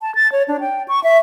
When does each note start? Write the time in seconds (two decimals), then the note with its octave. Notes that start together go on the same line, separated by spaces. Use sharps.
0.02 A5
0.15 A6
0.32 C#5
0.48 D4
0.60 G5
0.88 C#6
1.04 E5